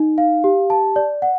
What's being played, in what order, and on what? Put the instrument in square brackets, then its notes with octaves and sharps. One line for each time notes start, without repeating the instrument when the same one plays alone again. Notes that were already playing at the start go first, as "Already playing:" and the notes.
Already playing: [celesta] D#4
F5
G4
A5
D5
F#5